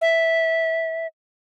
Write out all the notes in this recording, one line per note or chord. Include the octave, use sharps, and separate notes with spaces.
E5